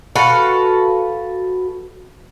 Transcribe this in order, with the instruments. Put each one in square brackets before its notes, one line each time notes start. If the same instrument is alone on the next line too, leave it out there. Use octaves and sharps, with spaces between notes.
[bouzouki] F#4 A4 B4 F5